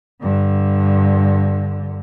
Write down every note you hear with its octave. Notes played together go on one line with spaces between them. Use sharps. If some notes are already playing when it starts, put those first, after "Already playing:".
G2 D3